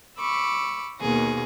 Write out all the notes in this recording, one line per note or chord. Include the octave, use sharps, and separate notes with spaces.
B5 C#6 D6 E6
D#2 B2 A#3 G#4 A#6